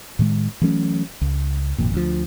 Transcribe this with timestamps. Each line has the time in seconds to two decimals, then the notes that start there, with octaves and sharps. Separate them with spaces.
0.19 A2 D#3 G#3
0.62 E3 F#3 A3 C#4
1.21 C#2
1.78 G#1 F2 A#2
1.94 D2 F3